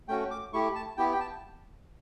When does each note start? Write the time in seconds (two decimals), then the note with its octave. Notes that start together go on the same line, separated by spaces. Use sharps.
0.08 A3 C#4 F#4 G5
0.31 D6
0.53 A3 E4 G4 C#6
0.75 A5
0.97 B3 E4 G4 G5
1.12 G5
1.20 A5